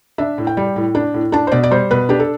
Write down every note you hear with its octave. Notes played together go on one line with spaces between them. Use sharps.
D4 E5
A2
G5
G3
A2
D4
A2
D4 A5
C5
B2 D5
D5
G3 C5
B2 B4
D4 G4
A4